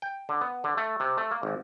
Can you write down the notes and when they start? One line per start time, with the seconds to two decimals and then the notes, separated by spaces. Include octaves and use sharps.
0.02 G5
0.29 D3
0.41 B3
0.64 D3
0.77 A3
1.00 C3
1.17 A3
1.31 A#3
1.43 G#1